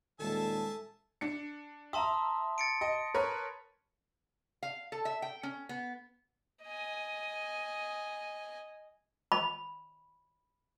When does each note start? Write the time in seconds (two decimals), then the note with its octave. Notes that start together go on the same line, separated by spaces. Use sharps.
0.20 D#1 G#3 G#4 A4 E5 A5
1.21 D4 C#7
1.93 E5 A5 A#5 C6 D#6
2.58 A6 C#7 D7
2.81 D#5
3.14 A#4 B4 C#5
4.63 F5
4.92 A4
5.05 E5
5.22 G5
5.43 C#4
5.69 B3
6.64 D#5 G#5
9.32 B5